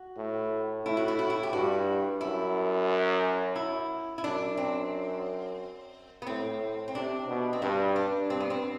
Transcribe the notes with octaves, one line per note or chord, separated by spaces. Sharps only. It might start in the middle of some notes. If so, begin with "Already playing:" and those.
Already playing: F#4
A2
A2 E4
F#4
E4
F#4
E4
G4
G2 F#4
F#2 E4
E4
E4
F#2 D4
C4
B3
A2 C4
C4
C3 D4
B2
C4
G2 D4
D4
G2 C4
B3
C4